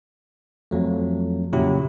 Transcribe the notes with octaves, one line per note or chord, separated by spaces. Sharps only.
F2 F#3 A3
A#2 C#3 F#3 E4 G4